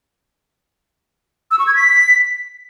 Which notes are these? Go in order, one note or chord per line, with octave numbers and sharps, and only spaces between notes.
E6
C#6
G#6
B6